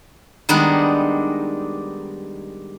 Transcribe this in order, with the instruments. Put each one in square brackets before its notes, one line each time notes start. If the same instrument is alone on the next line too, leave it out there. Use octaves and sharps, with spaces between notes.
[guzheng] D#3 G3 G#3 B3 D4 D#4